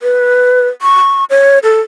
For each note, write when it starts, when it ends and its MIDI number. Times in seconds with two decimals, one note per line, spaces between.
0.02 0.68 71
0.82 1.24 85
1.30 1.59 73
1.63 1.80 69